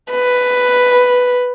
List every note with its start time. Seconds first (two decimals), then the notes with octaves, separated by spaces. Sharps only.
0.11 B4